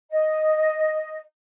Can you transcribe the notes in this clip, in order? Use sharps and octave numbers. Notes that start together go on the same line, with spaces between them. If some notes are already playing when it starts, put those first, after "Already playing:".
D#5